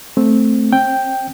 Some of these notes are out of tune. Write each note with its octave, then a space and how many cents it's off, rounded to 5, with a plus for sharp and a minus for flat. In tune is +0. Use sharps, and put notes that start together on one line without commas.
A3 +0 C4 +0
C4 +35 G5 +0